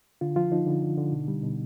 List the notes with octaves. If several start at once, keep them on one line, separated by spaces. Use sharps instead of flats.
D3 F4
F3 F4
F3 D#4
D3
D3
D3
B2
G3
B2